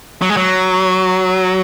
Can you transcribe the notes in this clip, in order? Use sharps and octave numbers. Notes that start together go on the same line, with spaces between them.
F#3
G#3
F#3